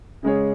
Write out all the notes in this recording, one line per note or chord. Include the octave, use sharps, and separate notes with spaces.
C#3 G#3 C#4 G#4 C#5